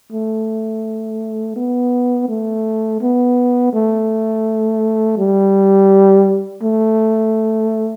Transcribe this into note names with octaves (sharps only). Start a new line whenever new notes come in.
A3
B3
A3
B3
A3
G3
A3